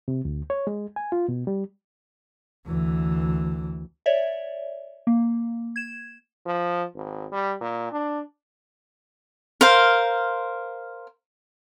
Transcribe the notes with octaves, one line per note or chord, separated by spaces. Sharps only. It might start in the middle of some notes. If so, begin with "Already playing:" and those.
C3
D2
C#5
G#3
G#5
F4
B2
G3
D2 E3
C#5 D5 E5
A#3
G#6 E7
F3
G#1
G3
A#2
D4
A#4 C5 F5